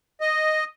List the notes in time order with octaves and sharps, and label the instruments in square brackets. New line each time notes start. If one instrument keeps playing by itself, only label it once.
[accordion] D#5